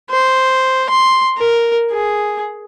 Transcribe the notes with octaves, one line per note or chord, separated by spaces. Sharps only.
C5
C6
A#4
G#4